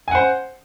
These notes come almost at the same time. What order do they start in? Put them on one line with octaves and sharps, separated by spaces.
G#5 F#5 C5